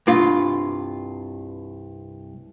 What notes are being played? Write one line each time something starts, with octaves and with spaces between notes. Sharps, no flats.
C2 G2 F4